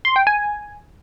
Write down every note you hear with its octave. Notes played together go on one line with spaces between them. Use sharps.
C6
G5
G#5